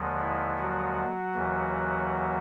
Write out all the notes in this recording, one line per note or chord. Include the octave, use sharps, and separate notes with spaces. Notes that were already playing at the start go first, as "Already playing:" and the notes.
Already playing: D#2 D3 F3 G#3
E4
F#3 F#4
D#2 C#3 E3